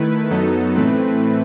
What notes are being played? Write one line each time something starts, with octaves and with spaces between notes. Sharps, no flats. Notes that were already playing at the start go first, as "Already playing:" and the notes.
Already playing: D#3 A3 E4 B4
F#2 F#3 B3 D#4 A4
A2 E3 A3 C4 B4